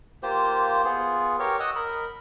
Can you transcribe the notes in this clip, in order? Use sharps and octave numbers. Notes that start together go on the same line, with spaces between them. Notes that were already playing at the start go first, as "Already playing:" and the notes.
A#3 F4 G4 C5
B3 F4 G#4
G4 A#4 C#5
D#5 F#5 D#6 E6
A#4 B5